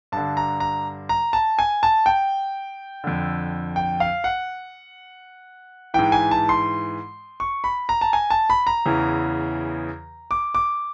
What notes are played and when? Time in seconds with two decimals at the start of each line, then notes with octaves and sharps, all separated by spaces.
0.12 G2 D3 A5
0.37 A#5
0.60 A#5
1.09 A#5
1.33 A5
1.59 G#5
1.83 A5
2.06 G5
3.04 F2 D3
3.76 G5
4.00 F5
4.24 F#5
5.94 G#2 E3 G5
6.12 G#5
6.31 A5
6.49 C6
7.40 C#6
7.64 B5
7.89 A#5
8.01 A5
8.13 G#5
8.30 A5
8.50 B5
8.67 A#5
8.86 E2 C#3 E3
10.31 D6
10.55 D6